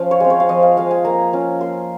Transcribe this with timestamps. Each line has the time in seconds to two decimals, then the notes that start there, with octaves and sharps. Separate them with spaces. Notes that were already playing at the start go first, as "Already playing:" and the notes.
Already playing: F3 C#4 F4 F5
0.11 C#5
0.20 G#3 C4
0.30 C#5
0.40 F5
0.49 F3 D#5
0.63 F5
0.77 G#3 C4 F5
0.91 G#5
1.05 A#3 A#5
1.33 C#4 F4
1.61 A#3 C6